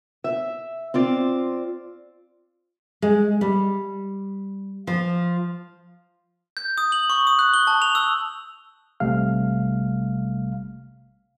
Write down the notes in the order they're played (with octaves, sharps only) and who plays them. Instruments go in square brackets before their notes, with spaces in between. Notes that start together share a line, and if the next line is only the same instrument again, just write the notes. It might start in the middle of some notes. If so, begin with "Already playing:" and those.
[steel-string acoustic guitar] E5
C4 F4 D5
[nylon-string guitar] G#3
G3
F3
[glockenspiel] G6
D#6
F#7
C#6
D#6
F#6
G7
A5
F7
E6
[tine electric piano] A1 C3 G3 A3 F5 F6